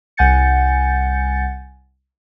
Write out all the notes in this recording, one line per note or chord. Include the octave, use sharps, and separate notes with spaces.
C2 F#5 G#5 G6 A6 C#7